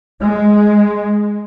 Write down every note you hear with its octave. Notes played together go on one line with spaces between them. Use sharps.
G#3